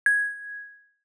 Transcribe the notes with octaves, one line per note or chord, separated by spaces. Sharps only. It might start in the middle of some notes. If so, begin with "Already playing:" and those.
G#6